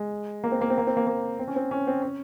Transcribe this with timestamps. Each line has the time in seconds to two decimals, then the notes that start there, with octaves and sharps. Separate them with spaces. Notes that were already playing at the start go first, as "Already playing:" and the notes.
Already playing: G#3
0.44 A#3
0.52 C4
0.61 A#3
0.70 C4
0.78 A#3
0.87 C4
0.97 A#3
1.07 A#3
1.39 C4
1.48 C#4
1.56 C4
1.71 C#4
1.87 C4
2.03 C#4